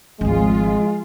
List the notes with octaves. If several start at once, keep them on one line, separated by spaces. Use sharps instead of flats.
G#1 D2 F3 G#3 F4